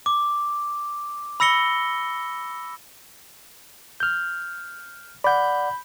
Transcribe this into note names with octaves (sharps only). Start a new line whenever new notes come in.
D6
B5 E6 A#6 C#7 G7
F6 G6
D5 F#5 B5 G6